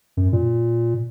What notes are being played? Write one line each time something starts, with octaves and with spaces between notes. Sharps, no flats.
F#2
A#2